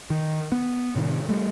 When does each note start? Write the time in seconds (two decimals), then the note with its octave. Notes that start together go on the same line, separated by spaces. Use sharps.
0.10 D#3
0.52 B3
0.95 A2 C3 D#3
1.29 G3 A3